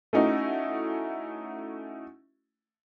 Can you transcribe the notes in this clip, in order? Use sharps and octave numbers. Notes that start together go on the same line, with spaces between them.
A3 C#4 D#4 E4 F#4